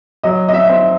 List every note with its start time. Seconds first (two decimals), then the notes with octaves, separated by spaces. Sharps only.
0.23 F#3 D#5
0.49 D#5
0.54 E5
0.69 C4 E5